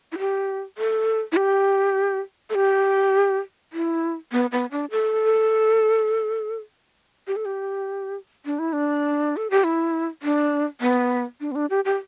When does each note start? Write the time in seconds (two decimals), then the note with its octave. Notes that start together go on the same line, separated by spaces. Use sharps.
0.12 E4
0.19 G4
0.78 A4
1.32 E4
1.37 G4
2.50 A4
2.55 G4
3.73 E4
4.32 B3
4.52 B3
4.71 D4
4.91 A4
7.27 G4
7.36 A4
7.45 G4
8.46 D4
8.59 E4
8.73 D4
9.37 A4
9.50 G4
9.64 E4
10.23 D4
10.81 B3
11.40 D4
11.52 B3
11.55 D4
11.70 G4
11.85 G4